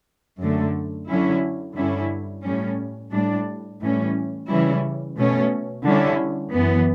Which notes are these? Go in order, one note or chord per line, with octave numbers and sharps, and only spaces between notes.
F#2 D3 A3
D3 F#3 C#4 E4
G2 D3 G3 C#4 E4
A2 G3 C#4
A2 G3 D4
A2 E3 G3 C#4
C#3 E3 G3 C#4 E4
B2 A3 C#4
D3 G3 C#4 E4
F#2 E3 B3